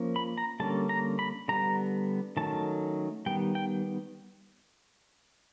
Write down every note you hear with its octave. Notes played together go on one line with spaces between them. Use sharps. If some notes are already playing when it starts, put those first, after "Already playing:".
Already playing: F3 A#3 C#4
B5
A#5
D3 G3 A#3 C#4 A5
A#5
B5
D3 G3 B3 A#5
D#3 F#3 A3 C#4 A5
D#3 G3 B3 G5
G5